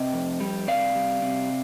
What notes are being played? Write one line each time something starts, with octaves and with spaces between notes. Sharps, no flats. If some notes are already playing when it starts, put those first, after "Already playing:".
Already playing: C3 D#5 G5
F2
G3
C3 D5 F5
G3
C3